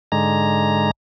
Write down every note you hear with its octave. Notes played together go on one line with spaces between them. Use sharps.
G#2 D3 G#3 A#5